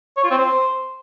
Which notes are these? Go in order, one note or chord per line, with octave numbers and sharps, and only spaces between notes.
C#5
F4
C4
C5